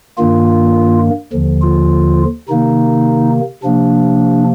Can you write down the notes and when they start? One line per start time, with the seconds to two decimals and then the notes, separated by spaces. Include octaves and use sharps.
0.18 G2 D#3 A#3 F4
1.33 D#2 D3 F3
1.62 F4
2.48 C3 D#3 A#3 D#4
3.63 C3 F3 A#3 D4